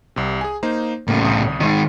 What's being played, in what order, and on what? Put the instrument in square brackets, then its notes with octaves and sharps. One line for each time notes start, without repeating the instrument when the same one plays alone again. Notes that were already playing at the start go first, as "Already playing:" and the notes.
[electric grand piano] C2 C3
G#4 G#5
A#3 D#4 C5
[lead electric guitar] A2 C#3 [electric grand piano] A#3
[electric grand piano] C2 D#6
[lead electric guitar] D#3 G#3